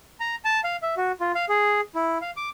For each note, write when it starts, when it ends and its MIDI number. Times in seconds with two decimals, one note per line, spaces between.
0.20 0.36 82
0.45 0.61 81
0.64 0.77 77
0.82 0.95 76
0.97 1.12 66
1.20 1.32 65
1.35 1.45 77
1.49 1.81 68
1.95 2.18 64
2.21 2.31 77
2.37 2.50 86